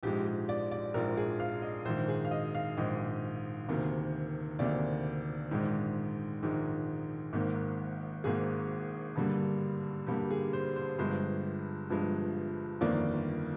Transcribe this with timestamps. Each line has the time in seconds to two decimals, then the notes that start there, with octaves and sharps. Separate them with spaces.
0.03 A#1 G#2 F3 G#3 G4
0.26 G4
0.49 D5
0.71 D5
0.94 A#1 G#2 F3 G#3 A#4
1.17 G#4
1.40 F5
1.62 D#5
1.85 A#1 G#2 D#3 C5
2.08 G#4
2.25 F5
2.31 D#5
2.55 F5
2.77 A#1 G#2 D#3 D#5
3.69 D2 C3 D#3 A#3
4.59 D2 C3 D#3 A#3 D5
5.51 A#1 G#2 D#3 G#3
6.42 A#1 G#2 D#3 G#3
7.33 G#1 G#2 D#3 A#3
8.24 G#1 G#2 D#3 A#3 G#4
9.16 G2 D3 G3 A#3
10.07 G2 D3 G3 A#3 G4
10.31 G#4
10.53 C5
10.76 C5
10.98 G1 G2 F3 G#3 C5
11.90 G1 G2 F3 G#3
12.81 G1 F2 D#3 A#3 D5